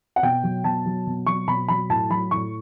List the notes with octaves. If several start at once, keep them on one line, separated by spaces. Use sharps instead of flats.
F#5
B2 G5
F#3
B2 A5
F#3
B2
F#3 C#6
B2 B5
F#3 B5
A2 A5
F#3 B5
A2 C#6